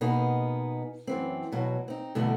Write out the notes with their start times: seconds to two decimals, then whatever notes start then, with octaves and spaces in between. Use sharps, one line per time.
0.01 B2 A#3 B3 D#4 G#4
1.07 F#2 E3 C4
1.52 E2 B2 F#3
1.88 C4 D#4
2.15 E2 G2 B2 D3 A3 B3